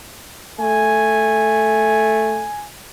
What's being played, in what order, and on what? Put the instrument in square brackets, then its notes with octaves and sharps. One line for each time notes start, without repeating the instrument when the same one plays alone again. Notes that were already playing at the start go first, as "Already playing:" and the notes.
[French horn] A3 [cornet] G#5